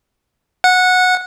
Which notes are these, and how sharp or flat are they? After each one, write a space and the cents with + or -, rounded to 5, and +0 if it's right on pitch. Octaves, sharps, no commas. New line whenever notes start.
F#5 -15